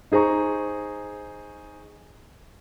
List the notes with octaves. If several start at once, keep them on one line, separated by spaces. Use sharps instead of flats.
D#4 G#4 C5 A#5 C#6